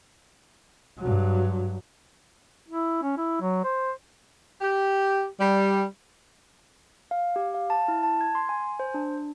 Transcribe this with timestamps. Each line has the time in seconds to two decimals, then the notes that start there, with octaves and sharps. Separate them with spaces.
0.99 G2 F#3
2.68 E4
3.03 C#4
3.17 E4
3.41 F#3
3.64 C5
4.62 G4
5.40 G3
7.11 F5
7.36 G4
7.54 F5
7.70 A5
7.88 E4
8.03 A5
8.21 G#6
8.35 C6
8.49 G#5
8.64 G#5
8.80 C5
8.94 D4